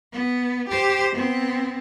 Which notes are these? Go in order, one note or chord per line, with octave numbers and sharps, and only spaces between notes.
B3
G4 C5
B3 C4